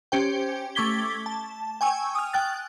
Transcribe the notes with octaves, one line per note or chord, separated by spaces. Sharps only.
C#4 G4 C5 G5
A3 C#6 D6 G#6 B6 G7
A5
G5 G#5 C#6 E6
D#6 F6
G5 F#6 A6